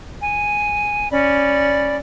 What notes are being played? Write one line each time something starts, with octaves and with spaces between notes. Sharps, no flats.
G#5
C#4 D5 B5